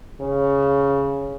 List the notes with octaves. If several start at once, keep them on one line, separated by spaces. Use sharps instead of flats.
C#3